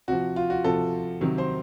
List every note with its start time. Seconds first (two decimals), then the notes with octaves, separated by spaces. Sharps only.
0.08 C3 F3 F#4
0.36 F4
0.50 F#4
0.64 C3 F3 A4
1.21 C3 D#3 F#3
1.38 C5